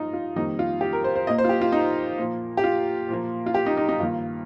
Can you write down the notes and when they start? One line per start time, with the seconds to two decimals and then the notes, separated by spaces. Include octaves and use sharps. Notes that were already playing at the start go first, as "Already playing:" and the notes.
Already playing: G2 F3 A#3 D#4 F4
0.13 F4
0.36 F2 D#3 G3 A#3 D#4
0.59 F4
0.81 G4
0.93 A#4
1.04 C5
1.16 C5
1.27 A#2 D#5
1.30 A#3
1.38 C5
1.44 F4
1.49 G4
1.61 F4
1.72 D#4
2.18 A#2 F3 A#3
2.57 G4
2.64 F4
3.09 A#2 F3 A#3
3.46 F4
3.54 G4
3.66 D#4
3.77 D#4
3.89 D#4
4.00 G2 D#3 A#3 F4